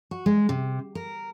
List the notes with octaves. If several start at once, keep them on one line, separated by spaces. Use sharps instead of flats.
F#4
G#3
C3
A#4